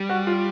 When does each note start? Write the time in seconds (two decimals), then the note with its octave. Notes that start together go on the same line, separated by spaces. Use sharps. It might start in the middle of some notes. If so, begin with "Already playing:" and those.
Already playing: G3
0.09 F#4
0.27 F4